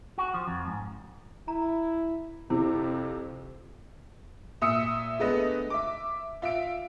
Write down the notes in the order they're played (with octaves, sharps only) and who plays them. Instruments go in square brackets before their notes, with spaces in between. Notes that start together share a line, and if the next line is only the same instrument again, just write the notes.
[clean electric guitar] F#4
F3
F2
G#2
[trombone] E4 [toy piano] A#5
[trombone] F2 [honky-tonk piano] C3 [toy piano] E4
[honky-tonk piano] A#2 E5 D#6 E6 C#7
G#3 A3 B3 D4 B4 D#5
E5 D6
F4 E5 F5 D7